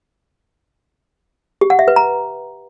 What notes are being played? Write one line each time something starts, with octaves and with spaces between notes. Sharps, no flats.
G4
F#5
E5
B4
A#5